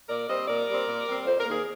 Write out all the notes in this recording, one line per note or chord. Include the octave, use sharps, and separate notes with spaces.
A#2 A#4 D5
G3 C4 C5 D#5
A#2 A#4 D5
G3 C4
A#2
G3 C4
F2 C5
A#4
D#3 A#3 G#4